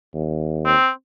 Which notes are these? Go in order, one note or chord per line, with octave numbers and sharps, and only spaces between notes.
D#2
C4